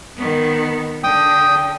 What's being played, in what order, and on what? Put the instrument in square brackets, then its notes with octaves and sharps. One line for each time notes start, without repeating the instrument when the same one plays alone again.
[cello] D#3 B3
[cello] D3 [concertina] G5 D#6